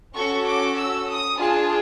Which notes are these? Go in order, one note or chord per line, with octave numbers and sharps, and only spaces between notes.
C#4 F#4 A4 C#6
D6
E6
D#6
D4 F4 G#4 A5